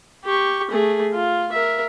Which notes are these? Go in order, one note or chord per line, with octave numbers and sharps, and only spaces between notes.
G4 C#6
A3 G#4
F4
A#4 E5